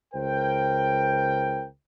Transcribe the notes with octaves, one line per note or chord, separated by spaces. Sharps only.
C#2 A#4 C5 G5